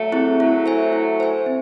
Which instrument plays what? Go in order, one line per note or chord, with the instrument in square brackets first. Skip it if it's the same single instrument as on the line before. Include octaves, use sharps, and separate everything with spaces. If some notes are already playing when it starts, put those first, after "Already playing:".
Already playing: [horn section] F#3 A3
[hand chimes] C4 E4 G#4
[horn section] F#3 A3 [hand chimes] E4
[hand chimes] C5 E5 G#5
E4
C5 E5 G#5
C4